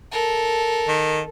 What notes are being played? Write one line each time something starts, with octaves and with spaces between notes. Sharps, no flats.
A4 A#4
D#3